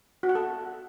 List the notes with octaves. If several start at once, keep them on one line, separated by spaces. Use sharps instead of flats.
F#4
F#5
A4